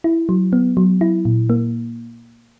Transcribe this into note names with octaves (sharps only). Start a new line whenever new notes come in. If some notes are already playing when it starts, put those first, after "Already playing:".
E4
F#3
B3
F#3
E4
A#2
A#3